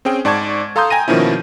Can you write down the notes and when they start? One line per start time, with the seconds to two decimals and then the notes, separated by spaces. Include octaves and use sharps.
0.05 C4 C#4 G#4 G5
0.25 G#2 D5 A5 C#6 G#6
0.76 A4 F5 A#5 C6 D#6 G6
0.90 G5 G#5 A#5 A#6 D#7
1.08 B2 D#3 F3 A#3 C#4 E4